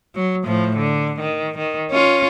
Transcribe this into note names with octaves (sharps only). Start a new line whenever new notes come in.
F#3
A2 F3
D3
D#3
D#3
C#4 F4